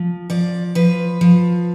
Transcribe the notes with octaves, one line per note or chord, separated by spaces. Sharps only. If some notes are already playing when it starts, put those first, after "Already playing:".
Already playing: F3
F3 D5
F3 B4
F3